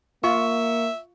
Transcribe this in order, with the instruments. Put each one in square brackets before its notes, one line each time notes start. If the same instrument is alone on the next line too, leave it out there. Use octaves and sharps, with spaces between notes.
[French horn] A#3 [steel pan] F4 [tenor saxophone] E5 [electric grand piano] C#6